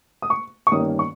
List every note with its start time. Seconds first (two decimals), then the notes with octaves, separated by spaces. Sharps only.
0.22 D#6
0.30 C#6
0.67 C#6
0.72 G1 G2 D#3 A#3 C#4 D#6
0.99 C#6